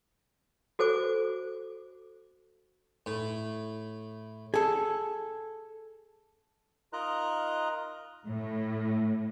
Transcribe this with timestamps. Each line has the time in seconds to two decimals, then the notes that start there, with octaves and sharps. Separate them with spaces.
0.79 F#4 A4 C5 G#5 D6
3.06 A2
4.54 G#4 A4
6.93 D#4 F4 A#4 D#5 A#5 F#6
8.26 A2